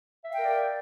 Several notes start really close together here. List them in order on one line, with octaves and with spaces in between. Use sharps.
E5 F5 G5 A#4 D5